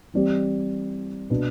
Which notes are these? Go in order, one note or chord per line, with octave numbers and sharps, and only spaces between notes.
E3 G3 C4 G4 D5
B2 B3 D4